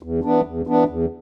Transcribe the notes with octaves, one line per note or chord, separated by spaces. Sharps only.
E2
E3 B3 D4
E2
E3 B3 D4
E2